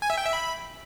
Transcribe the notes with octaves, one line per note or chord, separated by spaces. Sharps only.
G#5
E5
G5
E5
B5